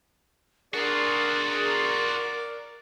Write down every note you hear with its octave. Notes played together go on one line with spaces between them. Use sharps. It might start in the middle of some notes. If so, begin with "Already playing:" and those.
D4 F4 F#4 G#4 A#4 D5